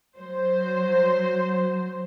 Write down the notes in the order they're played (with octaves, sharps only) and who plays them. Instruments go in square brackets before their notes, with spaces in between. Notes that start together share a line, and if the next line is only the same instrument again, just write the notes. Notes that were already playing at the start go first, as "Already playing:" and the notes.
[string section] F#3 C5